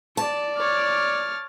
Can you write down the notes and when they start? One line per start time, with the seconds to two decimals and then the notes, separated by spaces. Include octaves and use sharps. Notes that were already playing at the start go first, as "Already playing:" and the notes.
0.17 D5 A5
0.57 C#5 D6 F6 A6